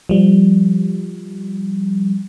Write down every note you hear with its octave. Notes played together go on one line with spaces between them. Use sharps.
F3 G3